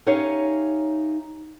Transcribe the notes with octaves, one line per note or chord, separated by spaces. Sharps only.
C#4 D#4 G4 C#5 E5 F5